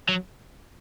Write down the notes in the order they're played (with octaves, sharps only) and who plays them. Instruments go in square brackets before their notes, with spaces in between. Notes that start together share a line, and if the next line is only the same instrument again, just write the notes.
[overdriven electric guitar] F#3